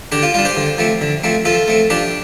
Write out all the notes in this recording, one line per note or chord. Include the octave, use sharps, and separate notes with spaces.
D3 D4 G4
F4
G3 D4 F4
G4 C5
D3
F3 A3 C4
D3
F3 A3 C4
F3 F4 A4
A3 C4
F3 D4 G4